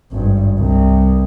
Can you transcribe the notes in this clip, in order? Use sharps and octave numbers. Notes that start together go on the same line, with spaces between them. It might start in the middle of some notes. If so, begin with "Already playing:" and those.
G#1 G2
C2